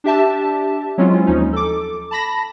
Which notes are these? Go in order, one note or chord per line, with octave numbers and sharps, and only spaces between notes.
D4 G4 E5 A5
F#3 G#3 C4 C#4 E4 F4
D#2 F3 C#4 D#4
A4 D6
A5 B5 A#6